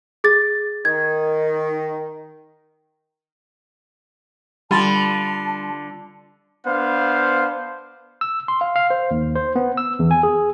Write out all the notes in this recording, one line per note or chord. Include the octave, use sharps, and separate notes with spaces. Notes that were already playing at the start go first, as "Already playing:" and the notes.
G#4 A6
D#3 G#6
D3 G3 F4 A5 B5 C6 A6
B3 D4 C5 F5
E6
C6
F5
F5
C5
D#2
C5
B3
E6
E2
G#5
G#4